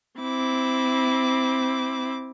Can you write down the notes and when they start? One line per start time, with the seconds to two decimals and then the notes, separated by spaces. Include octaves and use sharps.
0.20 C4 E4 D6